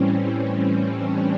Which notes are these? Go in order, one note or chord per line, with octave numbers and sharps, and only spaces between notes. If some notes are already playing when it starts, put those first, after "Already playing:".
Already playing: A2 E3 G3 C4 C#4
D4